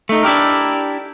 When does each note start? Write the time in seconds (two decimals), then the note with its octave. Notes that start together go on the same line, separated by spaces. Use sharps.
0.09 A3 D#4
0.23 D4 E4 G4 A#4